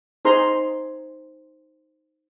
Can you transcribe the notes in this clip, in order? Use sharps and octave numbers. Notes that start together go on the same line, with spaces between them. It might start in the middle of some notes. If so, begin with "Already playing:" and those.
D#4 G#4 C5 A#5 C6